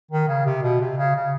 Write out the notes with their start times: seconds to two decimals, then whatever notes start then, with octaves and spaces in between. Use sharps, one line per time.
0.11 D#3
0.28 C#3
0.46 C3
0.63 B2
0.81 C3
0.97 C#3
1.16 C#3